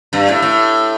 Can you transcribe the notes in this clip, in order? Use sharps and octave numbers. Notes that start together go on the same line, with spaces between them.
G2
A2
A2